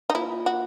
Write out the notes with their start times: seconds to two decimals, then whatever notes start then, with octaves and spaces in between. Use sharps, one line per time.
0.10 D#4
0.15 A#2 E4
0.46 F#4